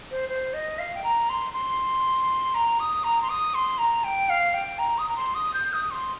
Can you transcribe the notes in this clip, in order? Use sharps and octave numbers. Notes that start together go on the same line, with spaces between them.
C5
C5
D#5
F5
G5
A#5
C6
C6
A#5
D#6
A#5
C6
D#6
C6
A#5
G5
F5
G5
A#5
D#6
A#5
C6
D#6
G6
D#6
C6